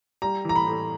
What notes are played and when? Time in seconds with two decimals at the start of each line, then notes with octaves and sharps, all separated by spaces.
0.22 G3 A#5
0.45 E3 A#5
0.56 B5
0.67 A2